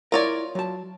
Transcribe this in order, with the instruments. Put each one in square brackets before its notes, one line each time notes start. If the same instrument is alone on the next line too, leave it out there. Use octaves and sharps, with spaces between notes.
[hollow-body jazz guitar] E4 A#4 [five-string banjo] F4 C#5 D5
[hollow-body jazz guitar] F#3 A5